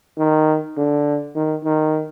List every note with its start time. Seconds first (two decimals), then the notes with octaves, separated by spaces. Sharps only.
0.18 D#3
0.77 D3
1.35 D#3
1.64 D#3